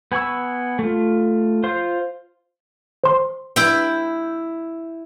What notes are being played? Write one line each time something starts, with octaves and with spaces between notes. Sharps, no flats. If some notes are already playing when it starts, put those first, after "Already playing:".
B3 G#5 B5 C#6 E6
A3 F4
F4 C5 F5 C6
C5 C6
E4 G5